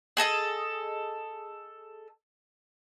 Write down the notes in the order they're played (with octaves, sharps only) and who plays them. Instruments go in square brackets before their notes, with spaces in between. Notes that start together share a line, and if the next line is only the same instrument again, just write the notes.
[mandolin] G#4 A4 D#5 A5